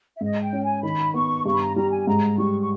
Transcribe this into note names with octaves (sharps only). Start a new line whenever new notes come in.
E5
G#2 D#5
G5
C#4
G#5
D#3 B5
B3 C#6
G2 C#6
B5
A#5
G3 A#5
G#5
G#2 A#5
G3 C#6
C#6